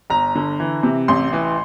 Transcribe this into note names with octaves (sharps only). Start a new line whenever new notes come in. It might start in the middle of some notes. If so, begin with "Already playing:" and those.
G1 A#5
D3
E3
C3
A1 C6
E3